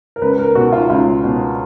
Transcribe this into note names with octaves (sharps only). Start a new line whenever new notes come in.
A#4
C#2 B4
A#4
B2 F#4
F4
C#2 F4
B2